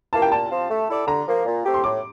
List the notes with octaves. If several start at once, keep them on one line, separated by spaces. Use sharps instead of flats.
E3 A#3 A5
G5
A#2 A5
F3 C4 F4
A3
E4 A4 D5
D3 A#5
F3 A#3
A#2
A3 C4 G4
C6
A2 D6